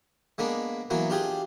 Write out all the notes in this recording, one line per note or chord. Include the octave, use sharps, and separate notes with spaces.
G#3 A#3 B3 D4
E3 F#3 A#3 B3
D4 F4 G4 G#4